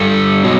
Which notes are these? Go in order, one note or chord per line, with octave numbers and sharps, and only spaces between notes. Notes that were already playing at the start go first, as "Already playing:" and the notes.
Already playing: G2 D3 G3 A4
B2 F#3